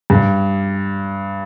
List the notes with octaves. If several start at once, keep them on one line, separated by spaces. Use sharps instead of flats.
G2